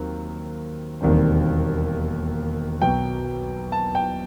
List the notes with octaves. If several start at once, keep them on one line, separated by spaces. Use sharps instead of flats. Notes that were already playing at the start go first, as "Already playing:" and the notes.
Already playing: D#2 D#3 F#3 C4
E1 D#2 D#3 G3 C4
B1 B2 F#3 B3 G5
A5
G5